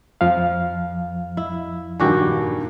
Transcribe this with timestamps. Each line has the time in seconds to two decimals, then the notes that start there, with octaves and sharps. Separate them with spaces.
0.21 F2 F3 F5
1.37 E4
2.00 G2 A#2 D#3 F#4 G4 G#5